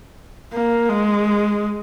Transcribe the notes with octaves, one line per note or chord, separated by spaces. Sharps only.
A#3
G#3